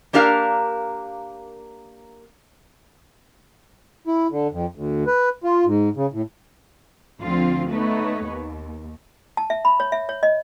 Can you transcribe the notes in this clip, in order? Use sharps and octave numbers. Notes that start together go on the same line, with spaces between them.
A#3 D4 G4 A#4 F5
E4
D3
F2
D2
B4
F4
G#2
C#3
A2
D2 D3 F3 C4 F4
A3 B3 D#4 B4 C#5
D#2
A5
E5
B5
C#5
E5
C#5
D#5